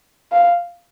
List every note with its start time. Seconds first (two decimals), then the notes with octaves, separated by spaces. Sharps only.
0.32 F5